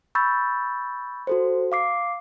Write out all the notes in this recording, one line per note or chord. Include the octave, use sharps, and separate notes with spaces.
B5 C#6 E6 G6 A6
F#4 A4 C5
F5 D6 C7